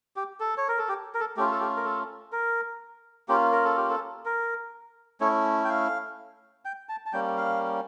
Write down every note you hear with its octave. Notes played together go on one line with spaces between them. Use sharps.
G4
A4
C#5
A#4
A4
G4
A#4
A4
A3 C#4 F4 G4
A4
G4
A#4
A4
A#4
A#3 C#4 F4 G4
A#4
A4
G4
A4
A#4
A3 C#4 E4 C#5
G5
F5
G5
A5
A5
G3 A#3 C#4 G5
F5